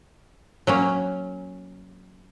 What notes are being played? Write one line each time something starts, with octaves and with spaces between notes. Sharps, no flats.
F#3 A#3 C#4